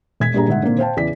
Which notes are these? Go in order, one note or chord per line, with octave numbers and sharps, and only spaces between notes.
E1 G#6 B6
A#1 G2 G3 A#3 G#4 A#5
G1 G#2 E5 F#5
A#2 D3 D#3 A#3 C4
C5 F5 G5 A5
E2 C#3 E3 D5 B6